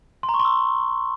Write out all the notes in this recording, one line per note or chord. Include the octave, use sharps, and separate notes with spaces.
C6
A#5
C#6
C6
E6